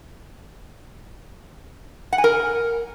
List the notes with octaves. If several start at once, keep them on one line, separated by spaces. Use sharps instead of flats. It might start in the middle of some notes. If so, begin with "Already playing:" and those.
F#5
G#5
A#4